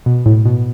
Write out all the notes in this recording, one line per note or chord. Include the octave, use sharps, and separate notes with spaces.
B2
A2
B2